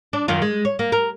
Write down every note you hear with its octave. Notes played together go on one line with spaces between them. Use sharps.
D4
F#2 D#3 F4
G#3
C#5
A#3
A#4